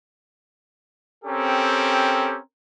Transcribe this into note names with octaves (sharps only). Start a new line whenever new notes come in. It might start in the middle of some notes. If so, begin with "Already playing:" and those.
C4 C#4 G4 A4 A#4